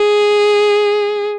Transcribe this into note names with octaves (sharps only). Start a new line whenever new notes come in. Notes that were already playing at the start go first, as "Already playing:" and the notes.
Already playing: G#4